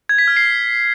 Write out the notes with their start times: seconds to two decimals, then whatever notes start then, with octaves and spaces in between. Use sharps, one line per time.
0.09 G#6
0.18 B6
0.28 F6
0.37 C7